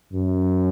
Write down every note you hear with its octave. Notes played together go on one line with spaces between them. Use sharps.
F#2